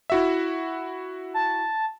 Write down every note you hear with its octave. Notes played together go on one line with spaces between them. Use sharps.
E4 F#4 E5
A5